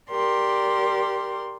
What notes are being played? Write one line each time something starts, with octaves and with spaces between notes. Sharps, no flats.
G4 A#4 D5 C6